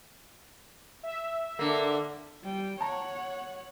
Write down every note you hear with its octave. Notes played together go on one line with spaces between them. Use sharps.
E5
D3 A#3
G3 G5
C#5 F#5 A5 A#5